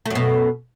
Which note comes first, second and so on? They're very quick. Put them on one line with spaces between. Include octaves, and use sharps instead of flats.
A3 F#2 B2